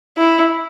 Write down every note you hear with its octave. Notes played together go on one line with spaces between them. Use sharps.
E4